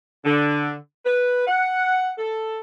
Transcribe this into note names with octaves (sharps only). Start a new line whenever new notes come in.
D3
B4
F#5
A4